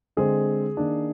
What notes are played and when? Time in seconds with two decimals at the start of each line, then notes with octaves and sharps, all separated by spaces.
0.17 D3 G#3 C4 G#4
0.77 D#3 A#3 D4